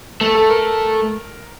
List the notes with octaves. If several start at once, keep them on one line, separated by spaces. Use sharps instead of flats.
A3 A4
A4
A#4